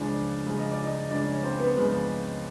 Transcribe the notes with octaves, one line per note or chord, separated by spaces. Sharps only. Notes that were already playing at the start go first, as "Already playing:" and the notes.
Already playing: C#2 C#3 F3 D4 D5
C#2 C#3 F3
D#5
D5
D#4 D#5
C#2 C#3 F3 D4 D5
C#4 C#5
C4 C5
B3 B4
C#2 C#3 F3 B3 B4